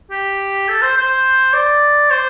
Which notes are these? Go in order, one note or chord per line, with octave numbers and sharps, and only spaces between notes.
G4
A4
C5
C5
D5
C5